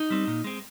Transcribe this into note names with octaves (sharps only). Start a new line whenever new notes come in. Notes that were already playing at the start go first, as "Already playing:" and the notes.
Already playing: D#4
G3 C4
A#2
G#3 C4